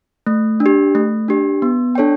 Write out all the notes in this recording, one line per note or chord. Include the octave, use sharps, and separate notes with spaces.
A3
D4
G4
A3
D4 G4
B3
D4 A4 C#5 G5